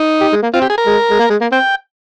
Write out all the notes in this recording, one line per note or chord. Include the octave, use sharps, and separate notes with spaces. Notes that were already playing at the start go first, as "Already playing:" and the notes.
Already playing: D#4
G4
G#3
A#3
C4 F4
G4
G#4
A#4
G#3
G#3
A#3
G#3
A#3
C4 G5